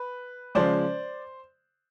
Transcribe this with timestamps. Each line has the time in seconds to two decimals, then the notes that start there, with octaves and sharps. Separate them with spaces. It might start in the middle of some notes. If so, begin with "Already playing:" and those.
Already playing: B4
0.55 C#3 F3 G#3 C5 D5